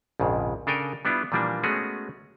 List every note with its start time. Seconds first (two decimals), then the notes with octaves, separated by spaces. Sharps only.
0.20 A#1 F2 G#2 C#3
0.67 C#3 D4 A4 A#4 G5 G#5
1.05 G3 B3 D4 E4 F4
1.32 A#2 E3 F3 G3 A#3 D4
1.63 G#3 A3 B3 C#4 F#4 G#4